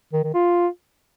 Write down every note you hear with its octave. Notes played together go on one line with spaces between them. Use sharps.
D#3
D#3
F4